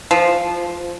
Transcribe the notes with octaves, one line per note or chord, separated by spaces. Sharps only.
F3